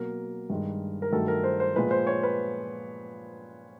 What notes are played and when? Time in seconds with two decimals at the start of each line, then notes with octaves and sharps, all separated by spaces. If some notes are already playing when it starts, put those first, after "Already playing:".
Already playing: B2 F#3 A#3 A#4
0.50 G2 D#3 G#3
1.02 A#4
1.12 G2 D#3 F#3 A3 A4
1.28 A#4
1.44 C5
1.60 C5
1.76 A#2 F3 G#3 B4
1.91 C5
2.07 C#5
2.23 B4